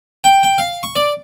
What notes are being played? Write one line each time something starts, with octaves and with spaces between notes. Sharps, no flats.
G5
G5
F5
C#6
D5